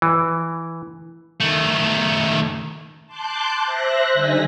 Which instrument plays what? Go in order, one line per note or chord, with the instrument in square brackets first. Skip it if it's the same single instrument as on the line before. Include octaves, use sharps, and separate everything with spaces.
[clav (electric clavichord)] E3
[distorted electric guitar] D#3 A3
[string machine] A5 C6 D6 F#6 G6
C5 E5 F#6 A#6
D3 G3 D#4 G#5 A#6 B6